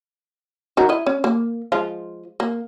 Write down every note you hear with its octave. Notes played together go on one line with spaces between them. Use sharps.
D#4 F#4 A#4
E4 D#5
C#4
A#3
F3 G#3 F4
A#3